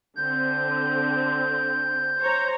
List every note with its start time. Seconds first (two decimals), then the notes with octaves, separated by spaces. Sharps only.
0.17 D3 C4 G6
2.20 C5 C#5 A#5